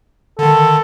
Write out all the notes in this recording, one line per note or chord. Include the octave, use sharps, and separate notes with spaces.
D3 D#3 A4